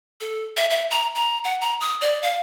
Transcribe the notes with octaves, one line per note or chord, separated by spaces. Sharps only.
A4
E5
E5
A#5
A#5
F#5
A#5
D#6
D5
F5